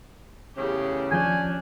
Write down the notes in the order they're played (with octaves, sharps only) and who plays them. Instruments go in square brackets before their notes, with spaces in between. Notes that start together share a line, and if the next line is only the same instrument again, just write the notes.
[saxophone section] E2 A2 C#3 [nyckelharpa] G4
[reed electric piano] D#2 F3 G6 [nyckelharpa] C#4 D4 [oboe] G#5